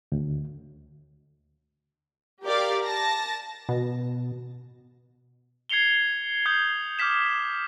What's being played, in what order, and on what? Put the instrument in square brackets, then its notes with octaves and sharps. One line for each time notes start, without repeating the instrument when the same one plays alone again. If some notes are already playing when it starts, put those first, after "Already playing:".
[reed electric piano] D2
[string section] G4 A#4 D5 F5
A5 A#6
[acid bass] B2
[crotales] G#6 C7 C#7 F7 G7
D#6 G6 C7
D6 F6 G6 B6 E7